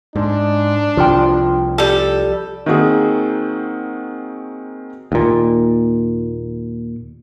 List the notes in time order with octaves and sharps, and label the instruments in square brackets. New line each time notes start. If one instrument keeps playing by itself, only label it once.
[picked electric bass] G#2 [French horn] D4
[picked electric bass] C2 F3 [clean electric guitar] F4 G5
[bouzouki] G3 A4
[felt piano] D#3 A#3 C4 F#4 G#4
[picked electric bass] D#2 A#2